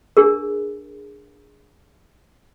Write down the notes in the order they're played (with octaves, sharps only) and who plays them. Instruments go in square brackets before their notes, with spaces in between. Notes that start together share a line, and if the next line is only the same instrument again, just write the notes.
[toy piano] D4 G#4 A#4